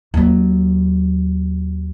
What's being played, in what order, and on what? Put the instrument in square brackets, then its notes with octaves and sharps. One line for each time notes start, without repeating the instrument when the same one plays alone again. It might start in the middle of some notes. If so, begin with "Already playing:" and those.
[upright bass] D#2 F#3